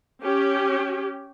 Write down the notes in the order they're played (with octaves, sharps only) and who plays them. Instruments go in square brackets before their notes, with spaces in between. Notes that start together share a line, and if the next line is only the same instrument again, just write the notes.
[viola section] C#4 G4